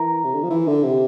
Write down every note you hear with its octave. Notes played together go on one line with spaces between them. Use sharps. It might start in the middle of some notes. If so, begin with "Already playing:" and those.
Already playing: E3 A#4
C3
D3
F3
E3
D3
C3